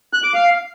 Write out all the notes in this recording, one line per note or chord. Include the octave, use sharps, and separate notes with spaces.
F#6
D6
F5